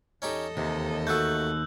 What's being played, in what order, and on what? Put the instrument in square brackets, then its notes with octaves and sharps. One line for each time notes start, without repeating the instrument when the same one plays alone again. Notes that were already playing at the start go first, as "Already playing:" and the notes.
[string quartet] E2 A4 D#5 [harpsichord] C#4 D#4 G4
[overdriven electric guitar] D#2 [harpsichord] C3
[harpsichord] A3 F#4 [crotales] E6 F#6 G6